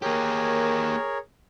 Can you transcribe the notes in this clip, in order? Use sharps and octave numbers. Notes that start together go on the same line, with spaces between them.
A#3 G4 G#4 A#4 C#5